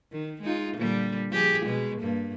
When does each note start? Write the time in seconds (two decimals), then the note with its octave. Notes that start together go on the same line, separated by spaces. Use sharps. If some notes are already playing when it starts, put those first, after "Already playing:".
0.12 D#3
0.42 G#3 D#4 F4
0.77 A#2 D3 G3
1.30 F3 G4 G#4
1.65 B2 G#3
2.01 G2 A#3